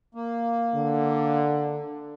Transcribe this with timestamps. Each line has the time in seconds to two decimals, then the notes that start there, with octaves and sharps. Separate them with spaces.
0.15 A#3
0.75 D3